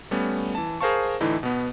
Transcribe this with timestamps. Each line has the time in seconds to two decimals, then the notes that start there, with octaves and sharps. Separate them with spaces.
0.11 G3 A3 B3 C#4
0.55 E3 A5
0.81 G#4 A#4 C5 F5 A5 C#6
1.21 A2 D3 E3 D#4 E4
1.43 B2 B3